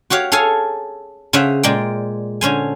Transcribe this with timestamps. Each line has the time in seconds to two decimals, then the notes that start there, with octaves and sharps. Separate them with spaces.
0.10 F#4 G4 C#5 F5
0.32 G#4 A4 C#5 F5 G#5
1.33 C#3 C#4 C5 E5 F#5
1.63 A#2 G#3 D5 G5
2.41 D3 C#4 C5 G#5